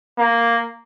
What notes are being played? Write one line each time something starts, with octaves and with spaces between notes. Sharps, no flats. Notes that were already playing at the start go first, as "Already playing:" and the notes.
A#3